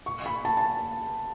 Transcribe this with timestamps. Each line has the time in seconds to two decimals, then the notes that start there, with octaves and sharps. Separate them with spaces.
0.06 C#6
0.26 B5
0.45 A5
0.57 A5